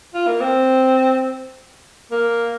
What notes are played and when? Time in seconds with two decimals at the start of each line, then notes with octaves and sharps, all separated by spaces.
0.14 F4
0.27 A#3
0.41 C4
2.11 A#3